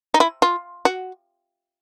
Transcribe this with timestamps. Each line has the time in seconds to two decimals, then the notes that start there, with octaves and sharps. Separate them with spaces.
0.14 D#4
0.20 E4
0.42 F4
0.85 F#4